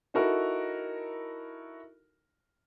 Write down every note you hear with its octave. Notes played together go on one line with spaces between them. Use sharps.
D#4 E4 F#4 A4 A#4